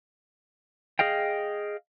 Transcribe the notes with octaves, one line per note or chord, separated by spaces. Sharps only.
G#4 D#5 F5 G5